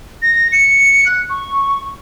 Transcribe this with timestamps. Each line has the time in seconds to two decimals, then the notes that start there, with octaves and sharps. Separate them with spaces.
0.22 A#6
0.52 C#7
1.06 F#6
1.30 C#6